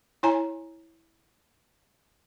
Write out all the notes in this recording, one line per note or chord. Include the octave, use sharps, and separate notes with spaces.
E4 C#5 G#5 A#5